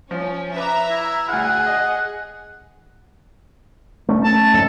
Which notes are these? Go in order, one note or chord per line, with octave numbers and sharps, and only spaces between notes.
F3 C#4
B4 E5 A#5 D6
E4
D2 G#4 F#5 F6
D#5
A3 C#4
A5
F2 G#2 A4